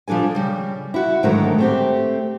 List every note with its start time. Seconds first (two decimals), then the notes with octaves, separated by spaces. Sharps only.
0.08 F3 G3 D4 A4 G#5
0.35 C#3 G3
0.94 E4 F#4
1.23 G#2 D3 D#3 F#3 A3 A#4
1.58 A3 C4 G4